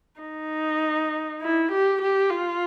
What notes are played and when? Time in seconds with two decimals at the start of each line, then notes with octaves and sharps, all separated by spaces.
0.20 D#4
1.42 E4
1.72 G4
2.02 G4
2.31 F4